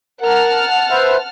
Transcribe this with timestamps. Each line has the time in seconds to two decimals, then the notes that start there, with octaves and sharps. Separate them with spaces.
0.22 A#4 F#5 A5 F6
0.91 B4 C5 E5